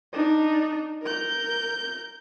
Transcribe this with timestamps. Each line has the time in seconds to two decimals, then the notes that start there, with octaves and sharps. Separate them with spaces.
0.13 D4 D#4
1.03 A#4 G6